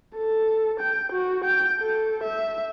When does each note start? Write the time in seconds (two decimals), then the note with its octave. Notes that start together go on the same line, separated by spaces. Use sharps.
0.16 A4
0.80 G5
1.12 F#4
1.45 G5
1.79 A4
2.24 E5